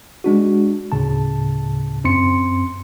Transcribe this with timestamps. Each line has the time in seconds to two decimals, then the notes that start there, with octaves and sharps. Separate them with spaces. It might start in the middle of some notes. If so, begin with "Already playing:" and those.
0.24 G#3 D4 F#4
0.92 D2 A2 C#3 A5
2.04 F#2 C4 C6 C#7